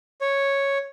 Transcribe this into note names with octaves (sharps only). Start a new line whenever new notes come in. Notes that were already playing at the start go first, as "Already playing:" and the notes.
C#5